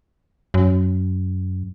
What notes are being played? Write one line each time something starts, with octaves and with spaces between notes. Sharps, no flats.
F#2